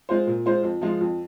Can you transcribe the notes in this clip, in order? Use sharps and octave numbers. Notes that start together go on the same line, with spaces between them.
G#3 F4 C5
A#2
G#3 F4 C5
F2
F3 G#3 F4
F2